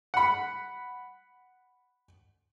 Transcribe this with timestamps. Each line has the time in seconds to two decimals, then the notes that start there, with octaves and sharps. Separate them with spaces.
0.14 F#5 B5